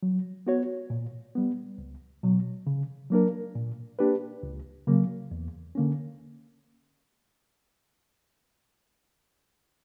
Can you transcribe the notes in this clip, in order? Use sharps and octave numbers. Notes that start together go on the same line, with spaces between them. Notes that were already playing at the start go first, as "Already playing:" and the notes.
F#3
B3 F#4 C#5
A#2
G3 B3
C#2
B2 F#3
C#3
F#3 A#3 D4 A#4
A#2
A#3 D4 G4 B4
C#2
C#3 F#3 A#3
E2
D3 A#3 C#4